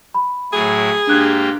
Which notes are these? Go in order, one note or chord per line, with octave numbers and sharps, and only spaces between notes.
B5
A2 F#3 E4 G#4
G#2 A#3 D4 G4 F#6 G#6